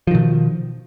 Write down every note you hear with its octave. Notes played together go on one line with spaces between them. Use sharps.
B2 D#3 F3